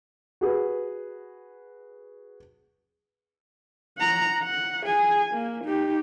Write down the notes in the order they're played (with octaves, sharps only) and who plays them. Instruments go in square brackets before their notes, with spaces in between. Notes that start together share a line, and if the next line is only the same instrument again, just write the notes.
[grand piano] F#4 G#4 B4
[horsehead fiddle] F#5 A#5
F#5
G#4 G#5
A#3
D#4 G4